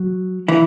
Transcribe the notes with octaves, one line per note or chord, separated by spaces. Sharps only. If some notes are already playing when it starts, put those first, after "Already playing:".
Already playing: F#3
E3 E4